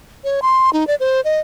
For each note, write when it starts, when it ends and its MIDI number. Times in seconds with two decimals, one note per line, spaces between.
0.24 0.40 73
0.42 0.70 84
0.73 0.87 63
0.87 0.95 74
1.00 1.21 72
1.25 1.40 75